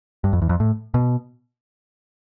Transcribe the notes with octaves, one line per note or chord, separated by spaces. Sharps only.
G2
F2
E2
F2
A2
B2